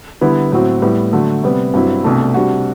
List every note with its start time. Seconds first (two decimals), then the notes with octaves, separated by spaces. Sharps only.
0.21 D3 G3 B3 E4
0.52 A2 F#3 C4 F#4
0.82 A2 G3 B3
1.13 D3 F#3 A3
1.43 C3 G3 B3
1.74 G2 F#3 C4 E4
2.04 C2 B2 A3 D4
2.34 C3 G3 D4 F#4